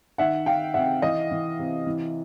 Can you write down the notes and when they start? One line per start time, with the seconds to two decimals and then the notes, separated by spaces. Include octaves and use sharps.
0.18 D#3 E5 F#5
0.46 D#3 F5 G5
0.74 C3 E5 F#5
1.02 E3 D#5 F5
1.31 E3
1.59 C3
1.87 E3